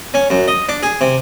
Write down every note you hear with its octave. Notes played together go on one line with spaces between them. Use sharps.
C#4
F#2
D#5
D4
G#4
C3